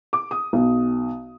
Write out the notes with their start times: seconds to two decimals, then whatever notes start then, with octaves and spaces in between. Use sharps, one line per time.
0.13 D6
0.31 D#6
0.53 B1